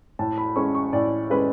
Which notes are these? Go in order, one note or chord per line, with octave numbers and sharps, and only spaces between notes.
A2 A5
B5
G#3 C#4 C#6
C#6
A2 D5
G#3 C#4 B4